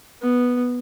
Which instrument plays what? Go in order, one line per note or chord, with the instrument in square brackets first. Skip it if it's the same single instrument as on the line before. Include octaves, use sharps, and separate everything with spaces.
[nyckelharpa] B3